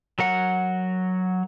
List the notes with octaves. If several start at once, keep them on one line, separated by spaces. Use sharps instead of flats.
F#3 A#4 F#5